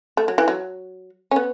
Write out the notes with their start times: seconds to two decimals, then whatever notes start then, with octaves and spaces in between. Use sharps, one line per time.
0.17 A3
0.28 F#3
0.38 E3
0.48 F#3
1.31 C#4
1.36 B3